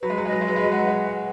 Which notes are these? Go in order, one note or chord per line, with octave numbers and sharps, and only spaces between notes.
F#3 B4
G#3
F#3
G#3 D#5
F#3
G#3
F#3 B4
G#3
F#3
G#3 F#5
F#3
G#3